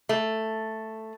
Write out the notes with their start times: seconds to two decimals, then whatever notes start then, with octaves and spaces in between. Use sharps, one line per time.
0.09 A3